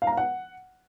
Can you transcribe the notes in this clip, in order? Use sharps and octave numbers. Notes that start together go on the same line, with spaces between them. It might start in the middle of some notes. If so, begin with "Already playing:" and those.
F5
A#5
F5
F#5